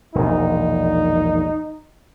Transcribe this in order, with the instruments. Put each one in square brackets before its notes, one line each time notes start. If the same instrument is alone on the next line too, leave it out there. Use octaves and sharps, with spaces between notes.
[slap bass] E1 A#1 [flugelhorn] D#4